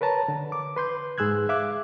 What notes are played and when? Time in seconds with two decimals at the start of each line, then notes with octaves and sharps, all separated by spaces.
0.01 A#4 B4 C#5 A5 A#5
0.28 D3
0.52 D6
0.76 B4 C6 G6
1.18 G#2 G#4 E6 F#6 G#6
1.49 E5 F5 D6 F#6